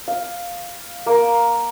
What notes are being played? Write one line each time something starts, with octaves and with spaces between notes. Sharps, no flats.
F5
A#3